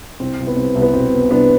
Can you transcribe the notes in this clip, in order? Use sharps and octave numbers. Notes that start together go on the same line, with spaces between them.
C2 C4
C2
B3
C2 C4
C2
B3
B2 C4
B2
C2 B3 D4